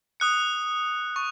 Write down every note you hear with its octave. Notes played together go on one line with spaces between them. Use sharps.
D#6 F#6 C#7
C#6